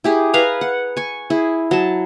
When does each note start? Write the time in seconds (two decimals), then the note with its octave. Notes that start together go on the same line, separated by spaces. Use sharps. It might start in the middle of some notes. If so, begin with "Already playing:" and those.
0.04 E4 G4 G#4
0.33 B4 F5 G#5 A#5
0.61 F#5
0.97 G#5 C#6
1.30 E4 G#4
1.71 F#3 A5